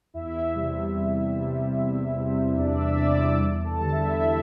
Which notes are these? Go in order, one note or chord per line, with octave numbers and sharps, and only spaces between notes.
E2 E4 E5
C3 G3
E2
C3 G3
E2
C3 G3
E2 D4 D5
E5 E6
C3 G3 D5 D6
E5 E6
E2 D5 D6
A4 A5
D3 G3
E4 E5
E4 E5